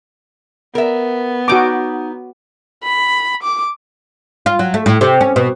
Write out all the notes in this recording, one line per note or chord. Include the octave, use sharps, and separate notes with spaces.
B3 A#4 E5
D#4 F#4 A#5 D6
B5
D6
F4
F#3
A3
A2
C3
C#4
B2